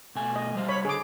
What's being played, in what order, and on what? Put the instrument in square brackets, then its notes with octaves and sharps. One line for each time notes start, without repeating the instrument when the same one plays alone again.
[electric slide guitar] B2 A3 G#5
[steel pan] D#5
[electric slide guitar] G3 C5 F5
[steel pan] C#5 B5
[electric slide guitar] D3 [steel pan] G#4 D6